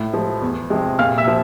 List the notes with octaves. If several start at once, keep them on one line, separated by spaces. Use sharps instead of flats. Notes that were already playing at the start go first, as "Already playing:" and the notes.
Already playing: A2
F3 G#3
E2
C3 F3 G#3
A#2 F5 F6
E5 E6
F3